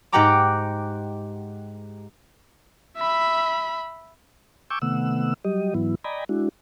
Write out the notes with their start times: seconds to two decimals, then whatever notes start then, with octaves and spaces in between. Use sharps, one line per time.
0.12 G#2 G4 F#5 G5 A#5 D6
2.98 E5 B5
4.70 G5 G#5 C#6 D6 E6 G6
4.82 C3 D#3 A3 B3 F#5 E6
5.45 F#3 G3 G4 D#5
5.74 G#2 E3 F#3 B3 E4
6.04 D5 D#5 G5 G#5 A#5 B5
6.29 G#3 D4 E4 F#4